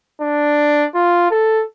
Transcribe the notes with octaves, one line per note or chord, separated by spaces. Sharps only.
D4
F4
A4